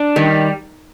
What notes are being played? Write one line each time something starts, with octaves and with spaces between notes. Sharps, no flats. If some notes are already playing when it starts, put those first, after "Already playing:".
Already playing: D4
D#3 G3